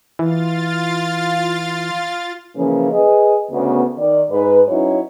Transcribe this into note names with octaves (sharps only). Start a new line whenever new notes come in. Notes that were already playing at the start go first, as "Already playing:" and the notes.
E3 F4 F5 A6
C#3 E3 F3 A#3 C#4
G#4 B4 D#5
D2 C#3 B3
D#3 D5
G#2 B4
F#3 C#4 D#4 E4 C#5